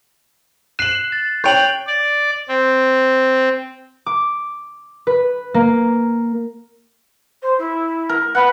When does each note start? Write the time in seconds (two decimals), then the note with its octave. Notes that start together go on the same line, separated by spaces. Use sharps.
0.79 F#6 C7 E7 F#7
1.12 A6
1.44 C#5 G5 G6 F7 F#7
1.87 D5
2.48 C4
4.06 D6
5.07 B4
5.54 A#3
7.42 C5
7.58 E4
8.09 A#4
8.35 B4 F#5